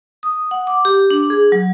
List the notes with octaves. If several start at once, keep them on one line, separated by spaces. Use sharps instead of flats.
D#6
F#5
D6
G4
D4
G#4
F#3